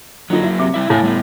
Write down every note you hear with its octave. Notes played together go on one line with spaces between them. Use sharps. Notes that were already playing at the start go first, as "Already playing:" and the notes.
D3 F3 F#3 A#3 D#4
E4
C3 D6
G3 E4 E5
A2 A3 F5 G#5
G3 B3